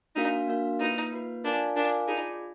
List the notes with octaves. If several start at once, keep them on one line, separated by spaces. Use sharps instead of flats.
A#3 D4 D#4 F#4 A#4 F5
A#3 D4 F#4 A#4 F5
A#3 D#4 F4 B4
A#3 F4 B4
D4 F4 A#4 D5 F5 G#5
D4 F4 A#4 D5 F5 G#5
D#4 F4 G#4 D5